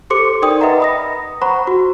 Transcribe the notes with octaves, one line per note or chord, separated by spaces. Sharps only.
G4 A4 C5 C6 D6 C#7
D#4 A#4 D5 G5 C6 D#6
B4 D#5 E5 F#5 A#5
B5 D#6 A#6
C5 F#5 A#5 B5 C#6
F#4